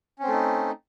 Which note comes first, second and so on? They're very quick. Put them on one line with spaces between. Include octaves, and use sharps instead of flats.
C#4 C4 A3 D#4